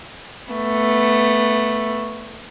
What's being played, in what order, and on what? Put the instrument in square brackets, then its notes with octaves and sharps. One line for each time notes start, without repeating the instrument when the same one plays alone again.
[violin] A3 B3